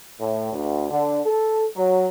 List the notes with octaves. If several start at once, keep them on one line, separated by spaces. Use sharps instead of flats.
A2
D2
D3
A4
F#3